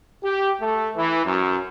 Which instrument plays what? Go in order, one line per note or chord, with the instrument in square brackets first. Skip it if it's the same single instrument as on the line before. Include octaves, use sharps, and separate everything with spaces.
[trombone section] G4
A3
E3
F#2